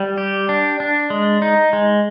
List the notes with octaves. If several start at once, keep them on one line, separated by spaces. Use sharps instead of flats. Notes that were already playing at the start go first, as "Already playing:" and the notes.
Already playing: G3
G4
D4
D4
G#3
D#4
G#3